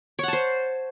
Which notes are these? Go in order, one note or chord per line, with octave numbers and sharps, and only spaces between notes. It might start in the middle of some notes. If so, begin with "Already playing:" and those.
C5 C#5 F#5 A5